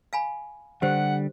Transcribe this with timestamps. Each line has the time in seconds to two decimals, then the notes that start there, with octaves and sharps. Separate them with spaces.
0.13 F5 G#5 B5
0.82 D3 G3 G4 C5 F#5